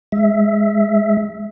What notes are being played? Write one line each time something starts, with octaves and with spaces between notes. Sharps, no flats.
G#3 E5